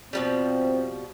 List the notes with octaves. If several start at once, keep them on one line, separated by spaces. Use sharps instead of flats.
B2 F3 G3 C4